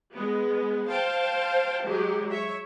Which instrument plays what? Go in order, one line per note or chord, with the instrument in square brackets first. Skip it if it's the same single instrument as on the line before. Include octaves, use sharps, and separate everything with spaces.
[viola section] G#3 B3
C5 F5 G5 A5
F#3 G#3 G4
C#5 E5